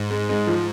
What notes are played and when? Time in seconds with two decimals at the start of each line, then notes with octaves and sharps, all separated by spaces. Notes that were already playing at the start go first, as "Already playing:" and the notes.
Already playing: G#2
0.11 G#3
0.29 G#3
0.47 F3